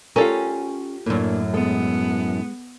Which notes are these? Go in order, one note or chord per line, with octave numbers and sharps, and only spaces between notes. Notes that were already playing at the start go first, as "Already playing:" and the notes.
C#4 F4 G4 A4 A#4
F#2 A2 A#3 D4
G#3 B3 A4